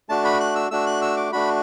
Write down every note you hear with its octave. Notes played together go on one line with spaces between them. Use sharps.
A3 D4 F#4 A5
B5
F#6
E6
A3 D4 F#4 E6
F#6
E6
D6
A3 D4 F#4 B5